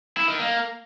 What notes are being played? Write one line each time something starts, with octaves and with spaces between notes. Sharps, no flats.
E4
D#3
A#3